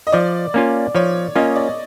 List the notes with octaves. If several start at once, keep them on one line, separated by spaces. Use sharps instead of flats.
D#5
F3 D5
A#3 C#4 F4
F3 C#5
A#3 C#4 F4 D#5
D5